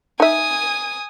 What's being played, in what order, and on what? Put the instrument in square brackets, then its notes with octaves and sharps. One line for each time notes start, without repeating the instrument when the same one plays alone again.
[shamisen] D#4 E5 [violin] G#5 D#6